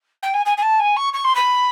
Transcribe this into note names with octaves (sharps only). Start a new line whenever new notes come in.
G5
G#5
G#5
G#5
A5
G#5
C#6
C#6
C6
B5